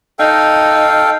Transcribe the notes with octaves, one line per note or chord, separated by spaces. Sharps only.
D#4 A4 F5 G5